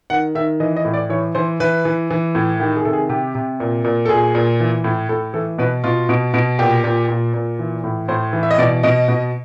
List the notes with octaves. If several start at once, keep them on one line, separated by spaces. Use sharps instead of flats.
D#3 F#5
D#3 E5
E3 D#5
D#5
A2
D5
E3 C#5
E3 C5
E3 B4
E3
E3
A2
D#3 G4
G#4
C3 A4
G#4
C3 G4
C3
A#2
A#2
A4
A#2 G#4
A#2
E3
A2
A2 A4
E3 A4
B2 B4
B2 F4
B2
B2
A#2 G4
A#2
A#2
A#2
E3
A2
A2 C5
E3
E5
D#5
B2 D5
B2 D#5
B2